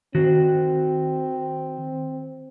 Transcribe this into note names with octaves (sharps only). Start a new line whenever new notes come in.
D#3 C4 F#4